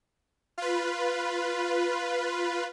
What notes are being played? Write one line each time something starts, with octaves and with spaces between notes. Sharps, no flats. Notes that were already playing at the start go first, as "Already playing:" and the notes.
F4 B4